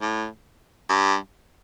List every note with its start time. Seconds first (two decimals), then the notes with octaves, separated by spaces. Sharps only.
0.01 A2
0.89 G2